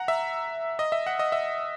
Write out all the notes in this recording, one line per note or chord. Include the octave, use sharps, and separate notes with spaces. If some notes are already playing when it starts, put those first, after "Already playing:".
Already playing: F#5 A#5
E5
D#5
E5
F#5
D#5
E5